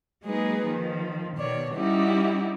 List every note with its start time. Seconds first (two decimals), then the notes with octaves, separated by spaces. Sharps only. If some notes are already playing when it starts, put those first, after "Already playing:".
0.24 F#3 G#3 A#3 D#4 G#4 B4
0.68 D#3 F3
1.37 B2 D#3 C#5 D5
1.75 G3 C#4 D#4 E4 F#4 G4